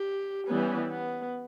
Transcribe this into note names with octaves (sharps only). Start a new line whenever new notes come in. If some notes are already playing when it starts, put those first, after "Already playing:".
Already playing: G4
E3 G3 B3 C#4
B3